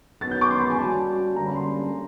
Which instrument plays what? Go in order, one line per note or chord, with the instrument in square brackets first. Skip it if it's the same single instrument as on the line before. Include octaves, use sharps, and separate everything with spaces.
[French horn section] F#2 D#3 F#3 B3 [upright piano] A6
[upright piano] G6
D6
C6
B5
G#5
[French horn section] G3 A#3 C#4 F#4 [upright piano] A5
[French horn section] G2 D3 G3 A#3 C#4 [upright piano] A#5
[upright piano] B5
C6